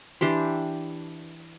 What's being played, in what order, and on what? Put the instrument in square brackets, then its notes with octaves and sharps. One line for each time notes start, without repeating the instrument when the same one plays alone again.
[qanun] E3 D4 G4 C6